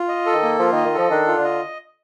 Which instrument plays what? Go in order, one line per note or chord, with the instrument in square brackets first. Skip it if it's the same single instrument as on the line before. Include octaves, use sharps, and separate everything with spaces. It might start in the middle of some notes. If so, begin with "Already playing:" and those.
Already playing: [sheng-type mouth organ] F4
D#5
A4
[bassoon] D#3
[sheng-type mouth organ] A#3
[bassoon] F3 [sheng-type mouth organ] F4
[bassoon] D#3 [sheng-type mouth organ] D#5
[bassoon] D#3
[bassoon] F3 [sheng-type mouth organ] A4
[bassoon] D#3 [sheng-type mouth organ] D4
[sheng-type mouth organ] F4
[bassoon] D3
[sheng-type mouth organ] D#5